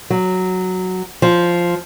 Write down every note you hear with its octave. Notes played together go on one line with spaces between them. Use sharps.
F#3
F3